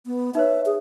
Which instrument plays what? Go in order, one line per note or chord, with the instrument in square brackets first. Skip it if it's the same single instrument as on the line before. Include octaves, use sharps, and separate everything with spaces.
[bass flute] B3
[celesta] D#4 B4 C#5 [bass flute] E5
[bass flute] G#4